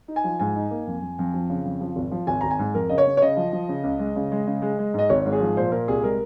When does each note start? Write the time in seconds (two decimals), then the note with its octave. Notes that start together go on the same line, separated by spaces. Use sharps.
0.08 D#4
0.16 G#5
0.24 F3
0.39 G#2 G#5
0.56 D#4
0.71 A#3
0.87 F2
1.02 F2
1.19 F2
1.34 F3
1.50 C#3
1.65 F2
1.81 F3
1.96 G#1
2.11 F3
2.27 G#1 G#5
2.41 G#1 A#5
2.51 G#5
2.59 G#2
2.74 F2 A#4
2.89 C#3 D#5
2.98 C#5
3.06 C#3
3.17 C#5
3.22 C#3 D#5
3.37 F3
3.52 F3
3.69 C#3
3.84 C#2
3.99 G#3
4.16 C#3
4.32 G#3
4.47 C#3
4.62 G#3
4.79 G#3
4.94 G#2 D#5
5.10 G#1 C#5
5.25 G#2
5.33 G#4
5.40 F3
5.57 A#2 C5
5.71 A#2 A#4
5.88 C2 G#4
6.03 G#3 A#4